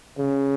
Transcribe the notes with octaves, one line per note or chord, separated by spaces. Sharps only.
C#3